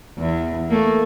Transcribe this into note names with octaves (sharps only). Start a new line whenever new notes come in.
E2
A3 A#3